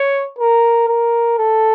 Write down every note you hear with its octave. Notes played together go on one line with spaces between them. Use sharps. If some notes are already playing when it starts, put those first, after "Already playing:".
Already playing: C#5
A#4
A#4
A4